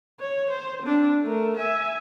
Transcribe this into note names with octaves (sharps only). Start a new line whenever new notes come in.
C#5
C5
C4 D4
A3 A#4
E5 G#5